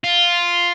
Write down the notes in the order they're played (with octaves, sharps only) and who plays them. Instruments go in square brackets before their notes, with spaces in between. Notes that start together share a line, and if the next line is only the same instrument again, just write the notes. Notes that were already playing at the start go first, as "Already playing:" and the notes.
[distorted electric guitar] F4